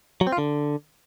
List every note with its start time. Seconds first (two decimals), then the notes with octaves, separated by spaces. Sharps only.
0.21 F#3
0.27 C4
0.32 F4
0.38 D3